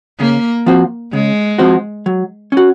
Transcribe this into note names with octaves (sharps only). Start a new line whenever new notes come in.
C#3 A#3
F3 C4 F#4 C5
C#3 G#3
F3 C4 F#4 C5
F#3
C#4 F#4